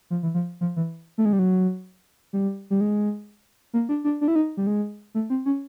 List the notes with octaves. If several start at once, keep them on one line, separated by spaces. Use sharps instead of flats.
F3
E3
F3
F3
E3
A3
G#3
G3
F#3
G3
G3
G#3
A#3
D4
D4
D4
E4
D#4
G3
G#3
A3
C4
C#4